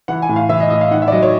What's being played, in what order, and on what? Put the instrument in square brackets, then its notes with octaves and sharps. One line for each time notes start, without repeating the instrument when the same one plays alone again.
[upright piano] E3 F#5
G#5
A2
F5
E3 E5
D#5
A2 D#5
F5
D#3 F#5
E5
D5
F#3 D#5
C#5